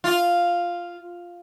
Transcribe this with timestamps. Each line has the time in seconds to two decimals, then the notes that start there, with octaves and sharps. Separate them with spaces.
0.04 F4